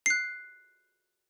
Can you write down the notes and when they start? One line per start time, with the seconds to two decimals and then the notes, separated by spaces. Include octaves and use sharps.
0.06 F#6 C7